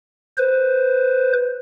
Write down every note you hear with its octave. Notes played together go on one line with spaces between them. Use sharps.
B4 C5